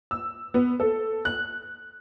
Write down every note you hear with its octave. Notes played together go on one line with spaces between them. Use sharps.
E6
B3
A4
F#6